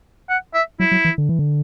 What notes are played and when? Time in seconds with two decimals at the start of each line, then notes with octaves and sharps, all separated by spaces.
0.29 F#5
0.54 E5
0.80 F#3 E4
0.92 F#3
1.05 E3
1.18 D3
1.29 E3
1.39 D3